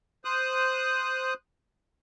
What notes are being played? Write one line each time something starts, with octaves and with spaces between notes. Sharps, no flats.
C5 D#6 F#6